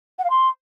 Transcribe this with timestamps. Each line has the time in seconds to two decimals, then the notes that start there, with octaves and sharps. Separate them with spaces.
0.19 F#5
0.24 F5
0.30 C6